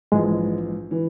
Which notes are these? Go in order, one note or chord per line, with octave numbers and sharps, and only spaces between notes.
A#1 G#2 E3 G#3
E3